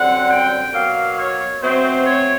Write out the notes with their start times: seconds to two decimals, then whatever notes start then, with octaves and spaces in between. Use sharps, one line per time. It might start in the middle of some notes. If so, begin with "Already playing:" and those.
Already playing: F#2 D3 G3 C4 F#5
0.30 G5
0.74 B2 F#3 A#3 F5
1.18 C#5
1.61 B2 F#3 A3 C4 C5
2.06 C#5